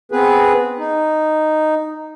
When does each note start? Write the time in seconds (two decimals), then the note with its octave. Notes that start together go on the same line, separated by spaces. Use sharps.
0.12 B3 C4 G#4 B4
0.78 D#4